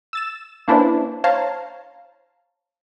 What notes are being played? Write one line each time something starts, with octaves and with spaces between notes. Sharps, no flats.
E6 A6 E7
A#3 C#4 D4 E4 B4 C5
C5 C#5 F5 A5 A#5